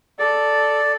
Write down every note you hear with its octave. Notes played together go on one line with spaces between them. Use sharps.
A4 D5